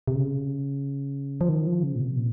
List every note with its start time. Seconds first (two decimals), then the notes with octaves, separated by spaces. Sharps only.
0.08 C3
0.15 C#3
1.41 F3
1.49 D#3
1.67 F3
1.83 C#3
1.96 A#2
2.00 C3
2.16 A#2